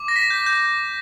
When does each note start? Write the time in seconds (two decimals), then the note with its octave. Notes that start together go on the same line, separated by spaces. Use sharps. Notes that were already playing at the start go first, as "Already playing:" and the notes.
Already playing: D6
0.08 A#6
0.16 B6
0.30 G6
0.46 G6